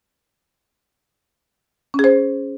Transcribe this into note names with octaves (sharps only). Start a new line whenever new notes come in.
C#4 G#4 C5